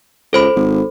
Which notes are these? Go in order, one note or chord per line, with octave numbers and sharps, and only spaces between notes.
C#2 A4 C5 B5
G#1